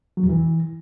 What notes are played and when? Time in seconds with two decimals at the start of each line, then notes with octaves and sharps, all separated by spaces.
0.17 F#3
0.23 E2
0.29 E3